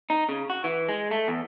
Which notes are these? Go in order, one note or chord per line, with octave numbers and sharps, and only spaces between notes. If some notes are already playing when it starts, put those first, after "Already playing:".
D#4
C#3
F#4
E3
G#3
A3
E2